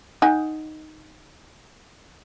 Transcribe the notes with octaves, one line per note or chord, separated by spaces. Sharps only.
D#4 F#5 G#5